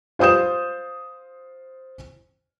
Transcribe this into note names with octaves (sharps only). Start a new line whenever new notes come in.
F4 C5 D#6 G6 E7